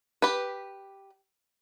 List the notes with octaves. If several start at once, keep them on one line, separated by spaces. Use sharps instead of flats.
G4 B4